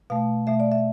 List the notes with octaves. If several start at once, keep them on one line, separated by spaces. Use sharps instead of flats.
B2 A3 F5
B2 A3 E5
D5
E5